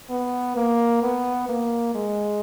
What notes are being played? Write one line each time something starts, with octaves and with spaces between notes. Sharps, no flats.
B3
A#3
B3
A#3
G#3